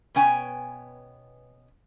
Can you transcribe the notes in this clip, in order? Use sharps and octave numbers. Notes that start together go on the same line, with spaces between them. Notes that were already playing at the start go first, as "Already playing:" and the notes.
B2 B3 C#4 G5 G#5